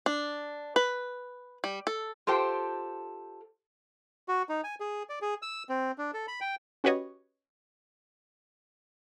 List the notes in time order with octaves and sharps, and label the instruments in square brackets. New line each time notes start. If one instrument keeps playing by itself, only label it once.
[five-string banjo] D4
B4
G3
A4
[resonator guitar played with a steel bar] F4 G4 A4 C5 G5
[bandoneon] F#4
D#4
G#5
G#4
D5
G#4
E6
C4
D4
A4
B5
G5
[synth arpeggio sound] C#4 F#4 G4 B4 C#5 D#5